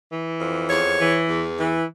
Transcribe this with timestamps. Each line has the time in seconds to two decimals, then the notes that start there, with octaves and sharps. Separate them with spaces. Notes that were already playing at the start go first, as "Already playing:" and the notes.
0.11 E3
0.41 F2
0.69 E2 C#5
0.99 E3
1.29 E2
1.58 E3